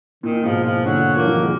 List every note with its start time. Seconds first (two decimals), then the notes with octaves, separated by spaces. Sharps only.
0.23 A#2 D#3
0.44 G#2 B2 F3
0.64 A#2 F3
0.85 A#2 D3 F#3
1.16 F3 A#3
1.26 D#3 F#3
1.43 G#3